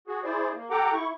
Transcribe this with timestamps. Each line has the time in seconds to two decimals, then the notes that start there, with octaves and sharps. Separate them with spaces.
0.07 F#4 G#4
0.24 E4 G#4 C5 D5
0.54 A#3
0.70 G4 A4 F#5 G5 A#5 D6
0.93 E4 C#6